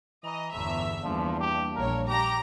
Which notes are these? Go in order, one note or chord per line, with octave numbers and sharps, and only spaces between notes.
E3 D#5 A#5
G1 E2 A2 E5
E2 F3 G3 A#3 D4
G4
A#1 A#4 C#5
G4 A#5